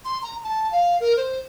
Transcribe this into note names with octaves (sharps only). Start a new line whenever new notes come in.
C6
A#5
A5
F5
A#4
C5